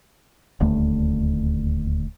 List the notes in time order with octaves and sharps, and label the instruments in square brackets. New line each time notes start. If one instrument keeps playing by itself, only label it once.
[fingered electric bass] D#1 D2 A3